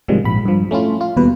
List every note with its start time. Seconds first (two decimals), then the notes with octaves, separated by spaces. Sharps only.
0.08 G#2 C3 D#3 F3 G3 G#3
0.25 A#1 G#2 B5
0.45 G2 F3
0.71 A3 C#4 E4 F4
1.01 F4
1.17 D#2 B2 G3 B4